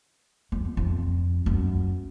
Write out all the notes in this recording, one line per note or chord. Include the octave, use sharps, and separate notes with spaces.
F2
F2
F#2